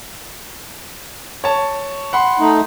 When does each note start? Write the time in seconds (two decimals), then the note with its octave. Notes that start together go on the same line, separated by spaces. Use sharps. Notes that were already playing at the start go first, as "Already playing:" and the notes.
1.44 C#5 A5
2.13 F#5 B5 C6
2.40 A3 D#4